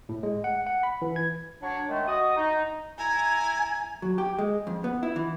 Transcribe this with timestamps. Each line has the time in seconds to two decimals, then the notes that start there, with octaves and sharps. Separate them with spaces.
0.09 A2
0.23 G#3
0.44 F#5
0.67 F#5
0.83 B5
1.02 E3
1.16 G#6
1.62 F#3 D4 C#5
1.88 D#3 G#3 A3
2.07 F#4 D#5 D#6
2.37 D#4
2.98 E4 G#5 A#5
4.02 F#3
4.18 G4
4.39 G#3
4.67 F2
4.84 B3
5.03 E4
5.16 E3